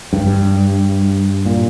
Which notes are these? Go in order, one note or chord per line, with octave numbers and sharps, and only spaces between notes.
G2
A#2